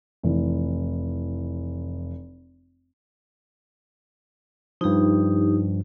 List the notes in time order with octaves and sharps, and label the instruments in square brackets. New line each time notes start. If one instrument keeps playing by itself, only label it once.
[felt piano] F1 E3
[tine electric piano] G2 F3 [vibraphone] D#4 G4